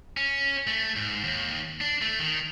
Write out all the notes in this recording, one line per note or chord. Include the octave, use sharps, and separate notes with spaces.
C#4
A3
G#2
D#2
D4
A3
D#3